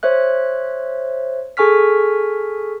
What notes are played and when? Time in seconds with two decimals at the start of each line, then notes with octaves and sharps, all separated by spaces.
0.03 C5 C#5 E5 F#6
1.57 G#4 A4 G#5 C#6 F6 B6